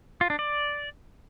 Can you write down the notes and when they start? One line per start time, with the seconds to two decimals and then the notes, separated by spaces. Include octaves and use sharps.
0.21 F4
0.30 D4
0.39 D5